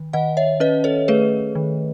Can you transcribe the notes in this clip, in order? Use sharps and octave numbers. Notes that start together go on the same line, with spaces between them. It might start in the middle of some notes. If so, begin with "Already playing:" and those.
Already playing: D#3
D#3 D#5 F#5
C#5 E5
C#4 B4 D#5
A4 C#5
A3 G#4 B4
D#3